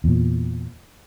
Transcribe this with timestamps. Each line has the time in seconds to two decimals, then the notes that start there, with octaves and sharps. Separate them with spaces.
0.04 E2 A#2